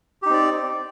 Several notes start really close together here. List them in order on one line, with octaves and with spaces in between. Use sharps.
G4 D#4 C4 D5